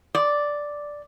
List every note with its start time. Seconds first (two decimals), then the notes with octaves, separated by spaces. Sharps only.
0.15 D5